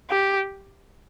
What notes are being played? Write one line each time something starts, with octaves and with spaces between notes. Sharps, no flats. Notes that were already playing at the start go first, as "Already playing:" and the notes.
G4